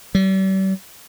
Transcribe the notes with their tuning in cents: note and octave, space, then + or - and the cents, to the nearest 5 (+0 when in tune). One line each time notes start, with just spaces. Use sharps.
G3 -40